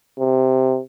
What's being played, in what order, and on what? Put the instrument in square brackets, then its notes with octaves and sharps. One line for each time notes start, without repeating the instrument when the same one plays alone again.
[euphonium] C3